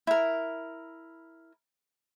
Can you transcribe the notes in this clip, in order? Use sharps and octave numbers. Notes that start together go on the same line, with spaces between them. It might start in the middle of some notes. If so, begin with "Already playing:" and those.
E4 A#4